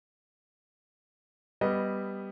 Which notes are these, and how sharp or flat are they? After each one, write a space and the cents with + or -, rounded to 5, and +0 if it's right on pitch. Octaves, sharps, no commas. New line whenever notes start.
G3 +0 B3 +0 D#5 +0